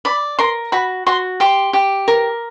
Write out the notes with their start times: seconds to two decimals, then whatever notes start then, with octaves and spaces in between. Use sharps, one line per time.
0.05 D5 B5
0.39 A#4 C6
0.72 F#4 B5
1.06 F#4 C6
1.40 G4 C6
1.73 G4
2.08 A#4